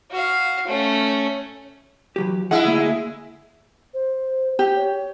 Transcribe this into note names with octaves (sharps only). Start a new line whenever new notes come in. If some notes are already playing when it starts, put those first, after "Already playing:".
F#4 F5
A3 C#4
E3 F#3 G4
G#3 E4 F#5
D2 A#3
C5
G4
C#5